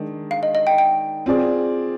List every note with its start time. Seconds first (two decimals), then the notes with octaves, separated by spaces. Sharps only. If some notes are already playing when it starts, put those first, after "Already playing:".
Already playing: D#3 G#3 D4
0.31 F5
0.43 D#5
0.55 D#5
0.67 G5
0.78 G5
1.26 C4 F4 G#4 D5